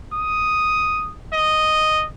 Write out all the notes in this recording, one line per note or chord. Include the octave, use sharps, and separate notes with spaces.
D#6
D#5